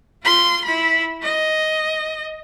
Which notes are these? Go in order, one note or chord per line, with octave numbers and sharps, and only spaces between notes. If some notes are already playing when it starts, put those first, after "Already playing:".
F4 C6
E4 B5
D#5